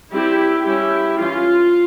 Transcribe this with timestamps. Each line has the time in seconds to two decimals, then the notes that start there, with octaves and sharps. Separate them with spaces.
0.12 G3 C4 E4 G4
0.66 G3 C#4 E4 G4
1.20 E3 G3 C#4 F4